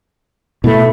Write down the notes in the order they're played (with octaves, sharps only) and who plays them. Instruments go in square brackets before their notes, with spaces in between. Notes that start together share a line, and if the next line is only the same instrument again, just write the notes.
[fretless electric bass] B2 A3 [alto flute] E4